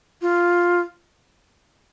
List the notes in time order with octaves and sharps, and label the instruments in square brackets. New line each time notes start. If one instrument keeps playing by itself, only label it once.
[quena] F4